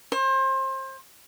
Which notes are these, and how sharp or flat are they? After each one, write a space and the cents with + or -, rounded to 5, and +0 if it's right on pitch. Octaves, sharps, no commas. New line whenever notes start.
C5 +30